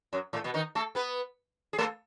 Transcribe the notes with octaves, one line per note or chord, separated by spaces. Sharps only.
F#2 F#3
A2 A3
B2 B3
D#3 D#4
A3 A4
B3 B4
G#4
A3 A4